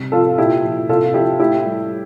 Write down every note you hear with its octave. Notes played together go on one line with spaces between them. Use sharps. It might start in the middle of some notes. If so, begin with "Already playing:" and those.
Already playing: C3 G3
F3 F4 A4
A#2 E4 G4
F3
C3 F4 A4
F3 E4 G4
A2 E4 G4
G3